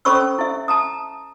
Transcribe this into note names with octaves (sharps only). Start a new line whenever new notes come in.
C#4 A4 C5 B5 C#6 E6
E4 E5
A5 A#5 D#6